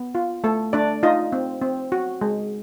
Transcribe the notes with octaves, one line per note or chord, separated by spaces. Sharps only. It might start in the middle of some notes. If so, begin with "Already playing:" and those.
Already playing: B3
F4
A3 A4
A3 D4 D5
D#4 F4 D#5
C4
C4
F#4
G#3